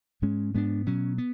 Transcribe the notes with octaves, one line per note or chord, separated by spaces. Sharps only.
G#2 G#3 C#4
G#2 G#3 B3 D4
B2 F#3 C#4
B3